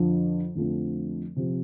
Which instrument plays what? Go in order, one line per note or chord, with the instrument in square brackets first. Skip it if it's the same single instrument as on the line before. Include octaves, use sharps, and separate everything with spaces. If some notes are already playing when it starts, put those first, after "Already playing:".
Already playing: [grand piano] F2 D3 F3
F2 D3 F3 A3 C4
C3 F3 C4